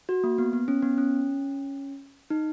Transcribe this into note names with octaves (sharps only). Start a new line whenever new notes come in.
F#4
A#3
B3
B3
C#4
B3
C#4
D#4